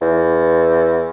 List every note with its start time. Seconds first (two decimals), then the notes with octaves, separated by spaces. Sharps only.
0.02 E2